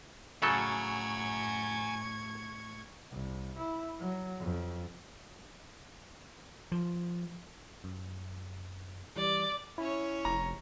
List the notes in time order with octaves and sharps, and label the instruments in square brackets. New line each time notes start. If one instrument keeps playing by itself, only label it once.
[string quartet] A2 C#6 G#6 [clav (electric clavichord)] C#3 F#3 A4 [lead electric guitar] F#5 G#5
[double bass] C2
E4
F#3
F2
[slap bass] F3
[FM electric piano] F#2
[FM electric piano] E3 G3 [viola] D5
[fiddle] C#4 C#5 [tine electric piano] E4
[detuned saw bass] F1 [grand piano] A#5